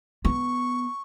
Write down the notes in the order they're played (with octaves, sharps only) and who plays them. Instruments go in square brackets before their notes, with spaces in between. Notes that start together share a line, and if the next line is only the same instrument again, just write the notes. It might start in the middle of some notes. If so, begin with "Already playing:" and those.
[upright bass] B3 [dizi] C#6